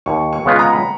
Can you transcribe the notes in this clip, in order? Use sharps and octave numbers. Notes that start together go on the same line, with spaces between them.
D#2 C#6
C#6
C#3 G#3 B3 F4
A#5
B5